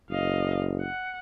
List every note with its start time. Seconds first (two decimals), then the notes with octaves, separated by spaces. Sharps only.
0.10 F#1 D#5 F5
0.81 F#5